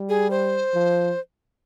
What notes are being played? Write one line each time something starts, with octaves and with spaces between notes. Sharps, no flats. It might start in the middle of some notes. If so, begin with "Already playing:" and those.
Already playing: G3
G#4
C5
F3